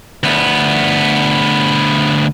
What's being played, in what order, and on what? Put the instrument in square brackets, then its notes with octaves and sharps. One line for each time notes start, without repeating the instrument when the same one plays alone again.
[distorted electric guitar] D2 B3